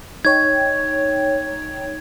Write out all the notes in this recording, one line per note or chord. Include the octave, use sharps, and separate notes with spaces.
D#4 C#5 G5 G#6